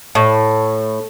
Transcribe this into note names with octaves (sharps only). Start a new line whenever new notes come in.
A2